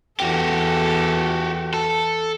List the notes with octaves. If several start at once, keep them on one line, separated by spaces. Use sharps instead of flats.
E2 F#4 G4 A4
A4